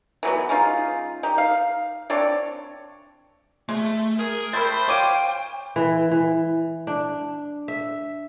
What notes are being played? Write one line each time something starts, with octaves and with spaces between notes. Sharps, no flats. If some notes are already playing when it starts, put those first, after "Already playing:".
E3 F#3 B3
G#3 C#4 D#4 F4
D#4 G4
F5
C4 D4 C#5 D5
G#3 A3
G#4 A#4
A3 C4 C5 B5 G6 A6
C#5 F5 G5 D6 D#7
E3
E3
D4
E5